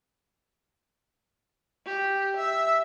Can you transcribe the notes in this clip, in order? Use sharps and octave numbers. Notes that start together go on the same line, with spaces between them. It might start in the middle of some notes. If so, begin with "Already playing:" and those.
G4
E5